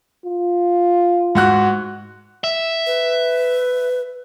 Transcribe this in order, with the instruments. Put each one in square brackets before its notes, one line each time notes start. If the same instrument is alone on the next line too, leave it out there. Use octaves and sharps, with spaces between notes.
[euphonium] F4
[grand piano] G#2 F#4 F#6
[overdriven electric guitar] E5
[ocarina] B4